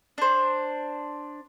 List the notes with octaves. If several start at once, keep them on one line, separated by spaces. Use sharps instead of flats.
D4 C5